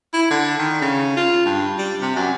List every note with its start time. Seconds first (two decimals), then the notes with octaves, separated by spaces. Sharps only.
0.13 E4
0.31 D3
0.58 D#3
0.81 C#3
1.16 F4
1.45 G2
1.78 G3
2.01 C3
2.15 F#2